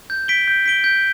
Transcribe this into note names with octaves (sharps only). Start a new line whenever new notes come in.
G6
B6 D7 G7
G6
B6 D7 G7
G6